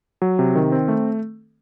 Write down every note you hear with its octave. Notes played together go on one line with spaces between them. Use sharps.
F#3
C3
D#3
C4
A3